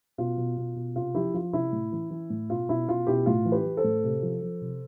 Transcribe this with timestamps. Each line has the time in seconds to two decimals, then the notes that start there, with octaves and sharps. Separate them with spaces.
0.18 B2 F4
0.37 B2
0.57 B2
0.76 B2
0.96 C3 F4
1.15 F3 E4 G4
1.34 F3 F4
1.53 C3 E4
1.72 A2
1.92 E3
2.11 E3
2.30 A2
2.50 B2 F4
2.69 B2 E4
2.88 B2 F4
3.07 B2 E4 G4
3.26 A2 F4
3.45 E3
3.52 G4 B4
3.65 E3
3.77 A4 C5
3.84 A2
4.04 C3
4.23 F3
4.42 F3
4.61 C3